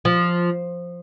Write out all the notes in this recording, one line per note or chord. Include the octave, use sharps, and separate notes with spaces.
F3